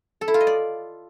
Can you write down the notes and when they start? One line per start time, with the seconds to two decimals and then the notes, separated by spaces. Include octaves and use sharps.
0.21 A4
0.28 E4
0.34 F4
0.40 D#5
0.47 D5